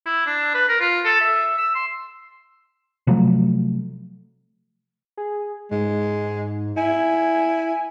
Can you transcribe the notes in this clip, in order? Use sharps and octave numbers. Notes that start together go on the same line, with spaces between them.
E4
D4
B4
A#4
F4
A4
E5
E6
C6
C3 F3 F#3 A3
G#4
G#2 G#3
E4 G#5